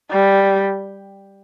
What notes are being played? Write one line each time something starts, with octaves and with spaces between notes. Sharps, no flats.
G3